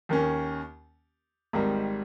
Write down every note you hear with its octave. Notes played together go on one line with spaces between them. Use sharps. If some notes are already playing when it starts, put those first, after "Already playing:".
D#2 D#3 A#3 C#4
G#1 G#2 D#3 G3